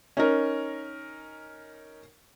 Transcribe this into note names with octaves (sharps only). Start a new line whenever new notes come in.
C#4 D#4 A#4